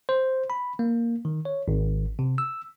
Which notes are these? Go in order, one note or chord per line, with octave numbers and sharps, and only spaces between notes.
C5
B5
A#3
D#3
C#5
G#1
C3
E6